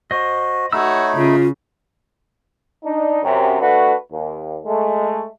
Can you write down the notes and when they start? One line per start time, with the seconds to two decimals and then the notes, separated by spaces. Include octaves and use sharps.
0.11 F#4 C5 D#5
0.73 A3 D#4 F#4 C#5 B5 E6
1.17 C#3 F4
2.85 D4 D#4
3.23 F#2 C3
3.61 A3 D4 F#4 B4
4.12 D#2
4.65 G#3 A3